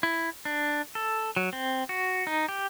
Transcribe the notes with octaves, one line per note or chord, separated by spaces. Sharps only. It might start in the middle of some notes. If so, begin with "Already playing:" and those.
E4
D4
A4
F#3
C4
F#4
D#4
G4